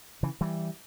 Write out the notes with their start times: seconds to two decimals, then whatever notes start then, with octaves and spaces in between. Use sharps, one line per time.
0.23 C#3 E3
0.41 E3 G3